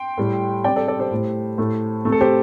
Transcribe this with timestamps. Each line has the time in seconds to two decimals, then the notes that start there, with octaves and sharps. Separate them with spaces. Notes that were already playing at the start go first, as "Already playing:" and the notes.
Already playing: G5 C6
0.18 A2 G3
0.64 C3 D5 G5
0.69 G3
0.76 A4 D5
0.88 A4 D5
0.99 G4 C5
1.11 A2 A3
1.58 A2 A3
2.05 C3 A3
2.12 A4
2.21 G4 C5